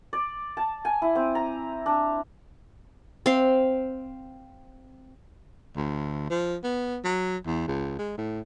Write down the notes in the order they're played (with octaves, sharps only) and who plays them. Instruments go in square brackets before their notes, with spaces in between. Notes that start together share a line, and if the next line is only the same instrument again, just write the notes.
[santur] D5
A5
G#5
E4
C4
A#5
D4
[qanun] C4 F5
[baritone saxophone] D2
F3
B3
F#3
E2
C#2
G#3
A2